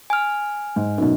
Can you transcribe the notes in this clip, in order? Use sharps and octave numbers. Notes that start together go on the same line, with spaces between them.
G#5 F6
G#2
F#2 B2 D#4